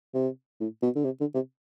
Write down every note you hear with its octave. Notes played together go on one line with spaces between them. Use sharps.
C3
A2
B2
D3
C3
D3
C3